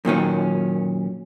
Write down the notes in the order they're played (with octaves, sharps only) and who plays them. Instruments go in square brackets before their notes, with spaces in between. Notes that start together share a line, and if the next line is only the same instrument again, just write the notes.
[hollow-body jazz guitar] F#2 A#2 D#3 C#4